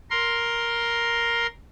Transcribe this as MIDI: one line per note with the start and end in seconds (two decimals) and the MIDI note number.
0.10 1.47 70
0.10 1.47 84